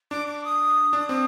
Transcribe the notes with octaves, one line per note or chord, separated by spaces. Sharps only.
D4 D6
D6
D#6
D4
C4 D#6